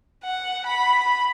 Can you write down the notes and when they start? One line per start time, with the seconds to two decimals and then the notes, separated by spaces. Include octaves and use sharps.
0.24 F#5
0.66 B5
1.00 B5